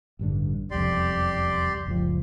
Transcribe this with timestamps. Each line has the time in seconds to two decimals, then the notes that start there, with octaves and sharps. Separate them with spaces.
0.19 A1 G2 D3
0.71 E1 C2 F2 G4 D5 C6
1.86 F#1 C#2 F3